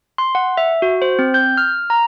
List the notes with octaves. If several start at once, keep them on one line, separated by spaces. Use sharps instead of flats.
C6
F#5
E5
F#4
C5
C4
G6
F6
A#5